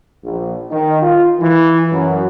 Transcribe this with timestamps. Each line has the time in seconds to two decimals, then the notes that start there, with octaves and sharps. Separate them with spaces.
0.24 A#1
0.70 D#3
1.01 F4
1.40 E3
1.92 F#2